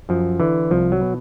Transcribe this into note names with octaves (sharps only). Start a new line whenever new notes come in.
F#2 F3
D3 E3
C2 F3
F#3
B2